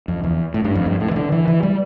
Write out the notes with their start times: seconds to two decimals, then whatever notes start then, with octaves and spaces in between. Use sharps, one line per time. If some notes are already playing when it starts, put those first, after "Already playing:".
0.08 F2
0.23 E2
0.54 A2
0.64 G2
0.75 F2
0.86 G2
1.00 A2
1.11 E3
1.16 D3
1.32 E3
1.48 E3
1.63 G3